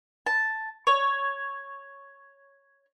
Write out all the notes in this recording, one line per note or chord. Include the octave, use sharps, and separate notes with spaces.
A5
C#5